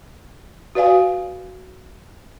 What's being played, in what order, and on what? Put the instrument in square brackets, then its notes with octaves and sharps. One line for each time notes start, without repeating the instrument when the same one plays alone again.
[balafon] F#4 B4 D5 F5 G#5